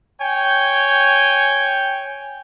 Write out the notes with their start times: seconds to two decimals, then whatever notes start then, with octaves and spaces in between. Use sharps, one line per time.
0.20 C#5 G5 G#5